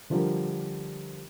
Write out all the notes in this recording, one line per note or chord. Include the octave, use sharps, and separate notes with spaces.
D3 F3 G3 A#4